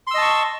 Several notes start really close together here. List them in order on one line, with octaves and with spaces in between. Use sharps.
C6 E6 D#5 A5 C#6